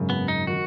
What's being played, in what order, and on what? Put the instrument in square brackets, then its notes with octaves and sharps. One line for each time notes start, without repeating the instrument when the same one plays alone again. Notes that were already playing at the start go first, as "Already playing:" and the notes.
Already playing: [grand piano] G#1 F#2 C#3
[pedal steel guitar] B3
D#4
[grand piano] D#3 F#3 [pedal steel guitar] F#4